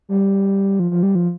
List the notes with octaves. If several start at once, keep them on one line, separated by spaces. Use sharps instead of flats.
G3
F3
F3
G3
F3